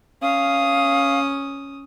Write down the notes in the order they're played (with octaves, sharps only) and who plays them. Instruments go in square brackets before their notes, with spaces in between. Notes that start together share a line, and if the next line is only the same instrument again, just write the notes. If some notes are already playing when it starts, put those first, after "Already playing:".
[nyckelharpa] C#4 D#6 [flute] F5